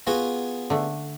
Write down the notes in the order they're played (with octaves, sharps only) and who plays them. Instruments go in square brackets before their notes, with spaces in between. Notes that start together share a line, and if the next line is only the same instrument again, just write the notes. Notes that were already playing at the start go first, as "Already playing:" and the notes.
[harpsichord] B3 F4 G#4 [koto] F#4
[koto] D3 A3